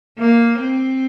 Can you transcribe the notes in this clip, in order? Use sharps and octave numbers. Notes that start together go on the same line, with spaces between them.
A#3
C4